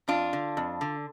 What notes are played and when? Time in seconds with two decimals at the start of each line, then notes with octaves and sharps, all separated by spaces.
0.08 F2 D4 F4
0.33 D3
0.57 F2
0.81 D3